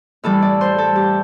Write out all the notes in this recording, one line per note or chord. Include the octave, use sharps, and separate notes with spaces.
A2 E3 G3 A4
D5
C5
A4
G4